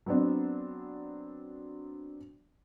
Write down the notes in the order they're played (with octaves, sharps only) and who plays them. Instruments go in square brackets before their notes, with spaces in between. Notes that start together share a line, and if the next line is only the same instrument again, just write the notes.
[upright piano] F#3 B3 C4 D4